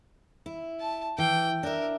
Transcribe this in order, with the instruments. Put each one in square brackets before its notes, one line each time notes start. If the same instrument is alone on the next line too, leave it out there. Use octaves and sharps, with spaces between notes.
[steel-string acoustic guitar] E4
[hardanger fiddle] A5
[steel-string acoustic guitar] E3 [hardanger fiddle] G5
[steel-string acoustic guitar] D4 E5 [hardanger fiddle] A#4